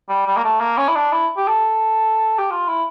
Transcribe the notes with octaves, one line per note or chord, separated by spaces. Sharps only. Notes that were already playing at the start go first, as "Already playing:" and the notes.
G3
G3
A#3
A3
A#3
C#4
E4
D4
E4
G4
A4
G4
F4
E4